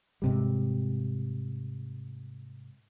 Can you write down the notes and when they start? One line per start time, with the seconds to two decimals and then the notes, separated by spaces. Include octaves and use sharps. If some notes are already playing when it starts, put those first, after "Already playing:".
0.22 G#2 C3 G3